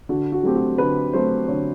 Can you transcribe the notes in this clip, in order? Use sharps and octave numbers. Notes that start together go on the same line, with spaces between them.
D3 F#4
F#4
F#3 A3 C4 G4
F#4
D3 B4
F#3 A3 C4 C5
D3 C#5